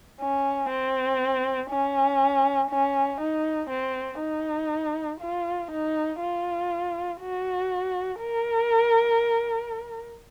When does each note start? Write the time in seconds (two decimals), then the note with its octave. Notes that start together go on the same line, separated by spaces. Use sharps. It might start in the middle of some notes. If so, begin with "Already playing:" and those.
0.20 C#4
0.69 C4
1.70 C#4
2.71 C#4
3.21 D#4
3.70 C4
4.20 D#4
5.20 F4
5.71 D#4
6.20 F4
7.21 F#4
8.21 A#4